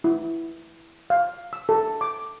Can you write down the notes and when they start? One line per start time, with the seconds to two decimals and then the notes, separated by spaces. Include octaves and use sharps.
0.04 E4
1.10 F5
1.53 E6
1.69 A4
2.01 D6